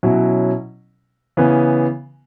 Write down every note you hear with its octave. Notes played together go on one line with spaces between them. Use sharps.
B2 F#3 C#4 E4
C#3 E3 B3